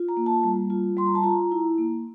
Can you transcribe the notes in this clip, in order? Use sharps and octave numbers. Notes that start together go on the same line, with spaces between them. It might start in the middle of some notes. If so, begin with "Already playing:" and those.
Already playing: F4
A#5
A#3
A5
G3
F4
G3 C6
A#5
A5
F4 A#5
E4
A#3